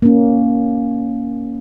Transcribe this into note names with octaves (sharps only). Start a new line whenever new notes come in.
A#3 C#4